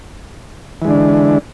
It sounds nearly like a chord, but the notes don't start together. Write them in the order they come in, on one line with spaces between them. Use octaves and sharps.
E3 G#3 D3 D4